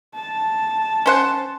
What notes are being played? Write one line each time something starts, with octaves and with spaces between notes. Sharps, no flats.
A5
C#4 C5 F#5